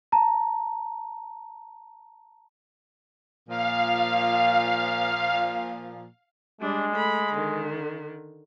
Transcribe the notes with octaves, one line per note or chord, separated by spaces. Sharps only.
A5 A#5
A#2 F3 F5
G3 G#3 D4
A3 B5
D3 D#3